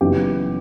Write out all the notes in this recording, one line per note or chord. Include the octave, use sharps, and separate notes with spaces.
F#1 F#2 E3 B3 D#4 G4